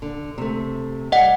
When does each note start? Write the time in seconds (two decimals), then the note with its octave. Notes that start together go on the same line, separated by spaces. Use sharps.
0.02 D3
0.38 C3 A3
1.12 G3 D#5 F#5